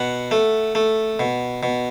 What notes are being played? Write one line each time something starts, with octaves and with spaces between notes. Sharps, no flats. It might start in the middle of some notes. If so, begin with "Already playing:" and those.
Already playing: B2 F#5
A3
A3
B2
B2